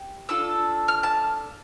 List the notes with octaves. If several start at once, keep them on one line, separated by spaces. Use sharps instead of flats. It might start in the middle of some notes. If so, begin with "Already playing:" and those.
Already playing: G4
D4 F4 A4 E6
F6
A5